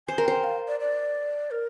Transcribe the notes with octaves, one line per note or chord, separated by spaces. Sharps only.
C5 G#5
A#4
C5 G5
F5
D5
D5
A#4